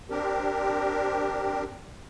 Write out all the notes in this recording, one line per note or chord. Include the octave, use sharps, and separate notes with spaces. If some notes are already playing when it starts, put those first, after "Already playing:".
C4 D4 G4 A#4